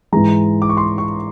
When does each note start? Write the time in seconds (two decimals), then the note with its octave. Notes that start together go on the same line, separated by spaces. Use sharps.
0.12 G#2 E3 G#3 A#5
0.62 D6
0.69 C#6
0.77 C6
0.98 C#6